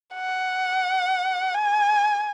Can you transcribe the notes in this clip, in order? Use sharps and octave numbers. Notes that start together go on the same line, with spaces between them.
F#5
G#5